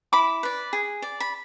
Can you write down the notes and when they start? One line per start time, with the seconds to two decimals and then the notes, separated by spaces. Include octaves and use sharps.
0.13 E4 B5 D6
0.43 B4 D5
0.73 G#4
1.02 D5
1.20 B5